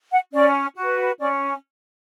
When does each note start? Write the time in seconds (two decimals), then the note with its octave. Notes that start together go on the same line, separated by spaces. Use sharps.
0.12 F#5
0.33 C#4 D5
0.76 F#4 B4
1.19 C#4 D5